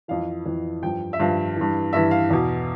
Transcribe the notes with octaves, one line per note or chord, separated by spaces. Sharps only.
F2 E3 F5
F2 E3
G2 F3 G5
E5
G2 F3 F5
G2 E3
G2 E3 E5
F5
E2 B2